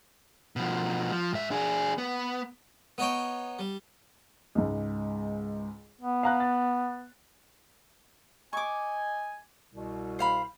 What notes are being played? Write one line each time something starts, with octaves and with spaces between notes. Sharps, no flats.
B2 F3
F3
G#2 E5
D4 G#4
B3
B3 D#4 C#5 G5
G3
C#2 G#2
B3
F5 A#5 F#6
A6
D#5 G#5 C#6 D6
C2 B2
C5 F5 B5